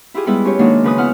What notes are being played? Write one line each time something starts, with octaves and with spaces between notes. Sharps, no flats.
E4 F4 G4 G#4
G3 G#3 B3 E4 G#4 B4
C#4 F4 G4 C#5
D#3 F#3 G#3 A#3 D4 D#4
C#3 F3 B4 G#5 D#6
B3 E4 F#5 F6